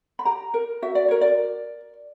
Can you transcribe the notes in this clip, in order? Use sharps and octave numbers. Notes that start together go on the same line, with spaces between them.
B5
G4 A#5
A#4
F#4 E5
D5
A#4 C#5
D5